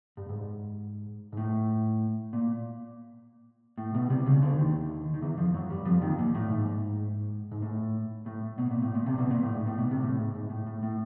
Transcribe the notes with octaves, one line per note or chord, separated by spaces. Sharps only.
G2
G#2
G#2
A2
A#2
A2
B1 B2
C2 C3
C#2 C#3
D2 D3
D#2 D#3
D#3
E2 E3
F2 F3
F#2 F#3
G2 G3
F2 F3
D#2 D#3
A#2
A2
G#2
G#2
A2
A2
B1 B2
A#2
A2
A#2
C2 C3
B1 B2
A#2
A2
G#2
A2
B1 B2
C2 C3
A2
G#2
G#2
A2
A2
A2